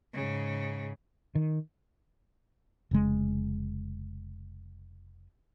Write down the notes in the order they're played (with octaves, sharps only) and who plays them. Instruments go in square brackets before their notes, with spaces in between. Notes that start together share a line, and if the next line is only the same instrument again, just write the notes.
[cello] G#2 C#3
[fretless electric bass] D#3
F1 C#3 G#3